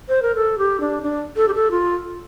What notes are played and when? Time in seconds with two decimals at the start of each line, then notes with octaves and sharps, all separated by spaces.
0.08 C5
0.22 A#4
0.35 A4
0.58 G4
0.80 D4
1.02 D4
1.36 A4
1.48 G4
1.54 A4
1.71 F4